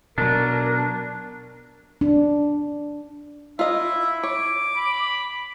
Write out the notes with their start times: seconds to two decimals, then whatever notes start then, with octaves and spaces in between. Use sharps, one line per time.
0.18 B2 F#3 D4 A#4
2.01 D4
3.59 E4 F4 D#5 E5
4.23 C#5 D6
4.77 B5